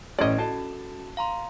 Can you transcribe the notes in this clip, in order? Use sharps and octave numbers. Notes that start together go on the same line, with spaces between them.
A1 C#4 D5 D#5 G#6 D7
C#4 F#4 A4 A5
F5 A#5 C6